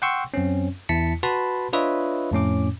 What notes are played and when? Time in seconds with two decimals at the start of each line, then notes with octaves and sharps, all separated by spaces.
0.02 F#5 G5 C6 C#6 E6
0.34 F#2 C4 C#4
0.89 E2 E4 A5 B6 C#7
1.23 F#4 B4 A5 B5 C6
1.73 D4 F4 B4 C#5 D#5 E5
2.31 F2 A2 C#4 D6